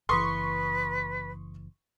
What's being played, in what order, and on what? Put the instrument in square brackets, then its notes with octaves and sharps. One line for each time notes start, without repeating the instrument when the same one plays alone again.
[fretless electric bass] F#1 E3 [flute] B4 [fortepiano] C6 C#6 D#6